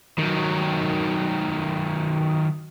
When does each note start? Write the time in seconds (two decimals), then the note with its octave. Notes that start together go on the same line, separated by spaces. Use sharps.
0.18 D#3 F#3